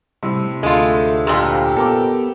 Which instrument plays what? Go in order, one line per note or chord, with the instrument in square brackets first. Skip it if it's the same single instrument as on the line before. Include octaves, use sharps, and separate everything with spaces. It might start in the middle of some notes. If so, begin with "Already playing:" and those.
[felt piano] A2 C3 [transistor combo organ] G3
[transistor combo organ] D2 D4 A4 [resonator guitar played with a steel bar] G#3 F4 [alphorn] A3
[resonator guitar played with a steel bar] F2 A#2 [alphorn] G4
[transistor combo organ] B3 [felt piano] A4 A#4 D6